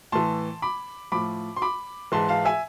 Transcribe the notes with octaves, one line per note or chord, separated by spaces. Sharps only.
A2 E3 A5 C6
B5 D6
A2 F3 B5 D6
C6
B5 D6
G#2 E3 A5 C6
F5 A5
E5 G#5